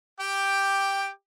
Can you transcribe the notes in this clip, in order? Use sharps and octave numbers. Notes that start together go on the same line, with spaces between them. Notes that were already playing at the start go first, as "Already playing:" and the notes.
G4 G5 D6